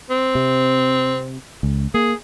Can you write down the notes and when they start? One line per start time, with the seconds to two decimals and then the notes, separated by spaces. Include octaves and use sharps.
0.10 C4
0.35 C3
1.63 C#2
1.94 A#3 G#4